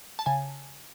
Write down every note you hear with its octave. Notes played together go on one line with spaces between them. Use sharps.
A5
C#3 G#5